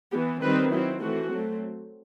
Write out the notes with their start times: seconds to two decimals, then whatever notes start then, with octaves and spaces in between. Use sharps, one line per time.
0.12 E3 B3 G4
0.42 D#3 G3 C4 B4
0.72 F#3 C4 E4
1.01 E3 A3 C4 F#4
1.31 F#3 A3 C4